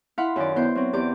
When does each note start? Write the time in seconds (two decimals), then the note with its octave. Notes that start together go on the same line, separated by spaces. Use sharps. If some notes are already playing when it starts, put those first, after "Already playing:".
0.18 E4 F5 F#5 B5 C6
0.36 F#2 D#3 D5
0.56 B3 E4 C5 C6 G6
0.75 F#3 C4
0.93 E2 G4 D5 D6